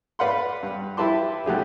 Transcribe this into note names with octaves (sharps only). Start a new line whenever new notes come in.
B4 D5 F5 F#5 B5 C6
G2
E4 G4 B4 A5 C6 D6
B1 A3 G4 G#4